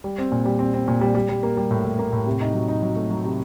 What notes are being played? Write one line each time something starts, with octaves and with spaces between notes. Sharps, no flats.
G3
C4
A#2
G3
C4
C4
A#2
G3
G3
G3
A#3
G3
A2
A2
A#3
A2
C3
D#4
F#3
D#4
F#3
A3
F#3
C3